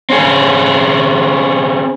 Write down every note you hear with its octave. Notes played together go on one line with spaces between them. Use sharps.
C4 C#4 G#4